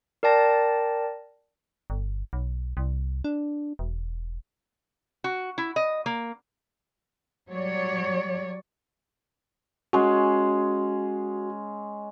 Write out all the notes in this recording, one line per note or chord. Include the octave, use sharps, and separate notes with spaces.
A#4 D5 G5 A5 A#6
G1
B1
C2
D4
E1
F#4
E4
D#5
A#3
F#3 G3 C#5 D5
G#3 C#4 F#4